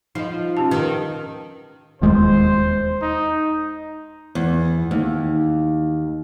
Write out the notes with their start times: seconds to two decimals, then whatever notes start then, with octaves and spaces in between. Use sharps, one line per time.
0.15 F3 D#4 D#5
0.57 C#4 G4 A5
0.71 D#3 B4
2.01 E1 D#2 G#3 C5
3.02 D#4
4.35 E2
4.91 D#2